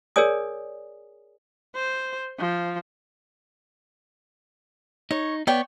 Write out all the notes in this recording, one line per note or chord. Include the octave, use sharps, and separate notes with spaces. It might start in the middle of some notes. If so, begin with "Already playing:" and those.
G#4 A#4 C#5 D5 G#5 D#6
C5
F3
D#4 C#5
B3 C#5 D5 G5